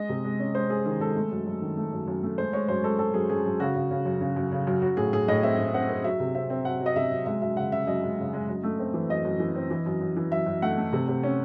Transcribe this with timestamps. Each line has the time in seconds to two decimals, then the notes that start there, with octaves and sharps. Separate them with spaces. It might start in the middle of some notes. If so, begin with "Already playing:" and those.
Already playing: G#3 D#5
0.09 C3
0.24 G#3
0.39 C#4
0.55 G#3 C5
0.70 G#3 G#4
0.86 D#3 G#4
1.01 G#3 A4
1.16 A3
1.31 F#2
1.46 F#2
1.61 D#3
1.77 A3
1.92 F#2
2.08 F#2
2.23 A3
2.38 G#3 C5
2.53 G#3 C#5
2.68 F#2 C5
2.84 G#3 A4
2.99 G#3 A4
3.14 F#2 G#4
3.29 F#2 G#4
3.45 F#2
3.60 C#3 F#4
3.76 C#3
3.91 C#3
4.05 F#2
4.21 C#3
4.36 F#2
4.52 C#3
4.67 F#2
4.82 F#3 F#4
4.97 A2 G#4
5.13 A2 G#4
5.28 A2 D#5
5.43 C4 E5
5.58 A2
5.74 C4 F#5
5.89 C4
6.04 F#3 E5
6.20 C3
6.35 C4 E5
6.50 C4
6.65 F#3 F#5
6.81 F#3
6.86 D#5
6.96 C3 E5
7.11 F#3
7.26 G#3 E5
7.42 F#2 E5
7.57 C#3 F#5
7.72 C#3 E5
7.87 F#2 D#5
8.03 G#3
8.18 C#3
8.33 G#3
8.49 F#2
8.64 A3
8.79 C4
8.94 E3
9.10 F#2 D#5
9.25 F#2
9.40 E3
9.55 C4
9.71 E3
9.86 F#2
10.01 F#2
10.16 E3
10.31 F#2 E5
10.46 F#2
10.62 A3 F#5
10.77 A3
10.93 C3
11.08 C3
11.23 C#4